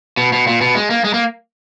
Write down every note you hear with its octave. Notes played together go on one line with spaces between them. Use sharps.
B2
B2
A#2
B2
G#3
A#3
G#3
A#3